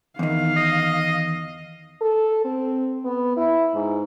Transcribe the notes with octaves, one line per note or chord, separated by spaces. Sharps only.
E2 D#3 F5
D#5
A4
C4
B3
E4
G#2